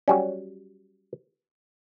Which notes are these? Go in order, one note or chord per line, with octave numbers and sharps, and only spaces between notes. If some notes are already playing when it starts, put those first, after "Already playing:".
F#3 G3 C#4